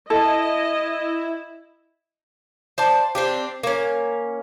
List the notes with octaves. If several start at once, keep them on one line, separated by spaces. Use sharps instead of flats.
E4 A4 D#5
C5 D5 A5
C4 D4 G4
A#3 C#4